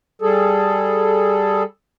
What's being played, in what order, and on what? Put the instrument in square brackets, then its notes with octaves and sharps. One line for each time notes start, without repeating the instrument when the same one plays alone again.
[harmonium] G3 G#4 A4